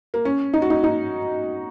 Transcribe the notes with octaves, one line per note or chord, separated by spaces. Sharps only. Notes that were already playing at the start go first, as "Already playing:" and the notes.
A#3
C#4
D#4
F#4
D#4
D#4